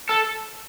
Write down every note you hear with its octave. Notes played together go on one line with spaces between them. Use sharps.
A4